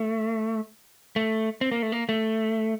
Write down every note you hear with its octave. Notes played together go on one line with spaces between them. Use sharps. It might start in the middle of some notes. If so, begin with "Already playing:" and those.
Already playing: A3
A3
C4
A#3
A3
A#3
A3